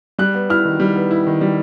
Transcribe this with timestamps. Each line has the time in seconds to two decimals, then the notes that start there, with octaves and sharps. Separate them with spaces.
0.19 G3 F#6
0.34 B3
0.50 E4 F6
0.65 D#3
0.80 G3
0.96 B3
1.11 E4
1.27 D#3
1.41 G3